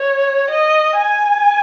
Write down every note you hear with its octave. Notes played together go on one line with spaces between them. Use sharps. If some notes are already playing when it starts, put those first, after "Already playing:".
Already playing: C#5
D#5
G#5